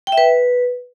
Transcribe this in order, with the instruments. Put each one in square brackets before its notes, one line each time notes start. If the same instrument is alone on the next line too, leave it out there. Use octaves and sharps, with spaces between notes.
[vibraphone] G5
E5
B4